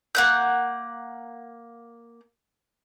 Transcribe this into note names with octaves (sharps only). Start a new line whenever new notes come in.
A#3 F#5 G6